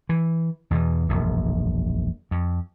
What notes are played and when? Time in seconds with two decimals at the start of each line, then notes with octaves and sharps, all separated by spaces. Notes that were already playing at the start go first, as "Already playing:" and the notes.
0.09 E3
0.71 E2 B2 D#3 E3
1.09 E1 A#1 F#2
2.31 F2